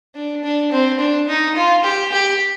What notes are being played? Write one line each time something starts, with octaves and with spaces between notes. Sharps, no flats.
D4
D4
C4
D4
D#4
F4
G4
G4